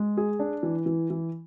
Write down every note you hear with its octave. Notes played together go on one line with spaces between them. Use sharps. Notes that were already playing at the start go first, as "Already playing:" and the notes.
Already playing: G#3
G#4
D4
E3
E3
E3